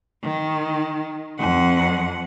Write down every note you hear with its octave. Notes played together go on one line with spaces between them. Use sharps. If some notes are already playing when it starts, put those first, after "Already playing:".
D#3
F2 F#5